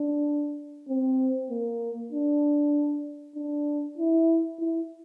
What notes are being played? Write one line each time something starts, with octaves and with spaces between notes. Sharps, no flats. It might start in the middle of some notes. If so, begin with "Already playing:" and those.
Already playing: D4
C4
A#3
D4
D4
E4
E4